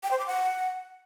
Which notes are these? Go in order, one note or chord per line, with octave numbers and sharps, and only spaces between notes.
G5
C5
D6
F#5